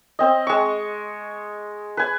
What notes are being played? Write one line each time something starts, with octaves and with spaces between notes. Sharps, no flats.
C4 D#5
G#3 C#6
B4 G#5